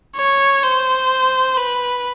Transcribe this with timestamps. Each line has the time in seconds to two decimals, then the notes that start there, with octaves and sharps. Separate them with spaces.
0.17 C#5
0.64 C5
1.57 B4